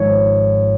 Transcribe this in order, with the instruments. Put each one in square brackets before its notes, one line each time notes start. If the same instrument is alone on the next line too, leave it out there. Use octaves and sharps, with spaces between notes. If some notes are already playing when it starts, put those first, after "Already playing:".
Already playing: [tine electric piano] G#1 G#2 F3 C#5